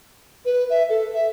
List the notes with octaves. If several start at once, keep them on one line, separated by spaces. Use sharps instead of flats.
B4
E5
A4
E5